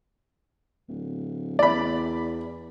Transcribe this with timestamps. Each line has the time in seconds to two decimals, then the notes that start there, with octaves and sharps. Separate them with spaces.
0.88 D1
1.59 E2 D5 B5